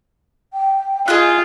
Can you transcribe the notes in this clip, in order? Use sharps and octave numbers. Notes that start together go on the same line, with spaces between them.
G5
F4 G#4 D#5 G5 F#6